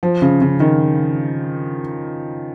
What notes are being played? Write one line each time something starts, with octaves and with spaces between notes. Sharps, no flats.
F3
C#3
C#3
D#3